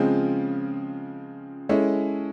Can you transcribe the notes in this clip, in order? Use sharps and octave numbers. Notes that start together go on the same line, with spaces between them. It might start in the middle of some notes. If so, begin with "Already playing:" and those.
Already playing: C#3 F3 G#3 C4 F4
G#3 C#4 E4 A4